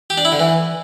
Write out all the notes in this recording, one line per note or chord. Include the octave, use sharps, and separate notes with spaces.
G4
D4
E4
D3
E3